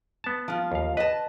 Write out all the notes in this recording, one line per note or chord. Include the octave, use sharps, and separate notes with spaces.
B3 A5
F3 F4
D#2 F5
B4 D#5 A5